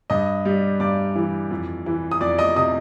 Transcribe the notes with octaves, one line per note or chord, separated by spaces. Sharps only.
G2 D#5 D#6
G3
G2 D5 D6
E3
F2
E3
D#6
F2 D5 D6
D#5 D#6
C3 D#5 D#6